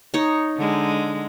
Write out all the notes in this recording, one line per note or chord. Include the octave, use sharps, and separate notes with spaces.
D#4 C#5
D3 G#3